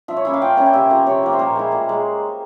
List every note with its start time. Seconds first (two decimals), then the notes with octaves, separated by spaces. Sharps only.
0.08 F3 E5
0.17 C#5
0.25 A#3 C#4 E4 E5
0.34 F5
0.42 F3 G5
0.57 A#3 C#4 E4 G#5
0.66 G5
0.73 C3 E5
0.90 F3 A#3
1.07 C3 C#5
1.23 F3 A#3
1.33 C5
1.39 A#2 A#4
1.56 G#3 E4
1.72 A#2
1.89 G#3